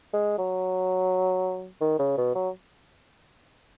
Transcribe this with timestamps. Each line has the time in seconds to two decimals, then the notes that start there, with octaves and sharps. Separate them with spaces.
0.14 G#3
0.38 F#3
1.81 D#3
1.99 C#3
2.18 B2
2.35 F#3